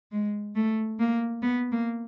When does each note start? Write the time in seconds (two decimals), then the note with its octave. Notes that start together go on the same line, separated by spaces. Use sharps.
0.12 G#3
0.55 A3
0.99 A#3
1.42 B3
1.72 A#3